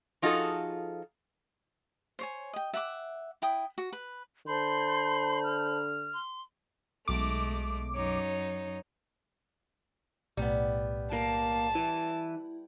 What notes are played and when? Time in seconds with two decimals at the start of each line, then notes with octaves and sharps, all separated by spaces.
0.22 F3 D#4 F4 F#4 G#4 A4
2.19 C5 C#5 G#5
2.53 D#5 G5
2.73 E5 F#5 B5 D6
3.42 E4 G5 D#6
3.78 F#4
3.93 B4
4.47 D3 C5 A5 B5 C6 G6
5.44 F6
6.13 C6
7.08 B1 G#3 A3 D6
7.95 F#2 D#4 C#5
10.37 B1 A2 G3 B3
11.13 A#3 A5
11.75 E3 E4